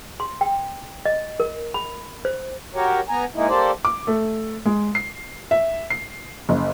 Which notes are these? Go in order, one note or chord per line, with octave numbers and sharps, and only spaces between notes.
C6
G5
D#5
A#4
B5
C5
F#4 G4 A#4 C#5
B3 G#5 A#5
G#3 A#3 D#4 E4
A#3 G4 A4 C5 D5
D6
A3
G#3
C7
E5
C7
F#1